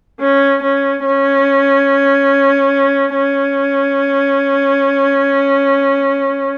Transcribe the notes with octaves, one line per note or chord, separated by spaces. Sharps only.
C#4
C#4
C#4
C#4